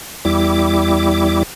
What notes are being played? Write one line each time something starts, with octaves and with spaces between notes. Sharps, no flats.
E2 G3 E4 D6